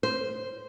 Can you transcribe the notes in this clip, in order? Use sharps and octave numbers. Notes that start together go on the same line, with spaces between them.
C5